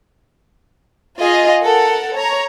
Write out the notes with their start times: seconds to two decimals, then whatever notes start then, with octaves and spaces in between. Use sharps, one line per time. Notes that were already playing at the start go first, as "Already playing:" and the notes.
1.20 F4 G#4 D#5
1.63 A4 A#4 F#5
2.13 C#5 A#5